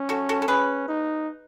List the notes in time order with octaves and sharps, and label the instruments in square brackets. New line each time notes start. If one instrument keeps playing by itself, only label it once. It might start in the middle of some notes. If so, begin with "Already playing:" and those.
Already playing: [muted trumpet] C#4
[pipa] F#4 A4
F#4 A4
A4
[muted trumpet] C#4 [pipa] G#4 B4
[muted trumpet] D#4